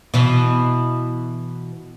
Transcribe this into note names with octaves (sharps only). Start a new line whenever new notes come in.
B2 E3